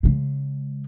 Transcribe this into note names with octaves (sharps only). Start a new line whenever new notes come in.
C#3 G#3